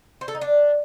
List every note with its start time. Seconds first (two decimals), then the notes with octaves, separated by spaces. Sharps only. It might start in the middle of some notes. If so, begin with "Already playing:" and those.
0.21 C5
0.28 A4
0.35 D#4
0.41 D4